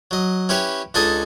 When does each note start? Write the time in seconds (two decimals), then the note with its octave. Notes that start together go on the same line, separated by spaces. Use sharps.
0.11 F#3 D#5
0.49 C#4 E4 G4 B4 C#5
0.94 C#2 D4 D#4 A4 D#5 G#5